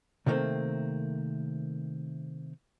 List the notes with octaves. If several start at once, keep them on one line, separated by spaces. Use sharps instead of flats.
C3 D#3 G3 A3 A#3 C4